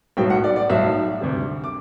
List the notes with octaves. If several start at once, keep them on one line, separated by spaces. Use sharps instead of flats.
B1 A2 F#3 G5
F#5
D5
D5
B1 A2 F#3 E5
D2 C3 G3
D6